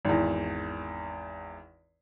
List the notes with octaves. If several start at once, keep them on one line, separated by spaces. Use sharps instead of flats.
G#1 E2